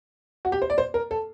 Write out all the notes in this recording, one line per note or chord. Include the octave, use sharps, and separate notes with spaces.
F#4
G4
C5
D5
C5
A#4
A4